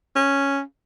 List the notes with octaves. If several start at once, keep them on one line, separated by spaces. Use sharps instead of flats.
C#4